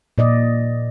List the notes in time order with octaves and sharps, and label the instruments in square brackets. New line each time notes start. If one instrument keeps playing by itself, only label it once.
[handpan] A#2 D5 D#5